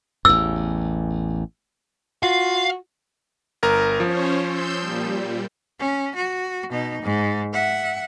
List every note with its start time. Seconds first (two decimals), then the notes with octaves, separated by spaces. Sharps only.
0.25 A1 E2 E6
2.23 F4 F#4 F5
3.63 G1 A#4 A#5
4.00 F3 C#4 C5 C#5
4.46 C6 E6 G6
4.80 A#2 G3
5.79 C#4
6.15 F#4
6.71 B2 D#4
7.03 G#2
7.53 E5 F#5